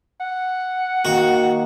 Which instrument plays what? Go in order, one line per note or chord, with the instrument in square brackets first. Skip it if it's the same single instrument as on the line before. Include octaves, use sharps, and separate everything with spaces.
[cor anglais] F#5
[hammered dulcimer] D#3 A#3 [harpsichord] F#4